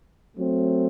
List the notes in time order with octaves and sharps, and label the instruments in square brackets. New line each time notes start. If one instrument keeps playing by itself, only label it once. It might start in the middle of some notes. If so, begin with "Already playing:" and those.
[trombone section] F#3 A3 C4